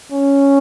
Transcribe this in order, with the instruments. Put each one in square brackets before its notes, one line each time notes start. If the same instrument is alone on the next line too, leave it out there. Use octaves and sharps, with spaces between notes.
[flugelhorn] C#4